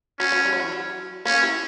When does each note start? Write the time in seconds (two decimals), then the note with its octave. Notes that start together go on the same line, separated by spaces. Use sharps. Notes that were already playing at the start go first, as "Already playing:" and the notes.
0.19 F#3 C#4
0.32 F#3
0.46 G3
0.53 F#3
0.60 E3
0.72 F#3
1.25 A#3 C#4
1.43 E4 G4